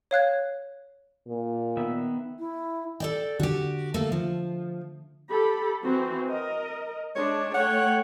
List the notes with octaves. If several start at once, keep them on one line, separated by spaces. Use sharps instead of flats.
C#5 F5 F#6 G#6
A#2
D#3 B3 E5
E4
A4 D5 G5
D3 F#4 G4
A3 A#3 A4
F3
G4 A4 B5
E3 C4 F#4
A#4 D#5
G#3 D4 C#5
A3 C#5 F#5 G5